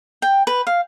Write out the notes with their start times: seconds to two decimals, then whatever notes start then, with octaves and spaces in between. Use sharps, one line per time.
0.22 G5
0.47 B4
0.67 F5